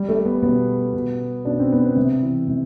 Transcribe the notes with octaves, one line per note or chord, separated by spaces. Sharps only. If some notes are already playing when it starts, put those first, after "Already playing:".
Already playing: G3
A3
B3
B2 B3
B2
B2 D4
C4
B3
C4
C3
E3
C3